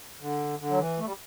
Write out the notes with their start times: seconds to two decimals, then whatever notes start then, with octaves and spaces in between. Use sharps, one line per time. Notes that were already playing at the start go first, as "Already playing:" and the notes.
0.21 D3
0.59 D3
0.70 F#3
0.79 E3
0.99 A3
1.06 G3